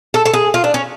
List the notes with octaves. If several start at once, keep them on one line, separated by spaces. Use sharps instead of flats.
A4
A4
G#4
F4
D4
C#4